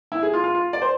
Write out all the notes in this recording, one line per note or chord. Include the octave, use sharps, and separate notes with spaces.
E4
G#4
F4
F4
F4
D5
C5